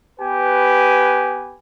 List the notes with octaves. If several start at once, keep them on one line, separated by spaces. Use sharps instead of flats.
B3 G4 B4 G#5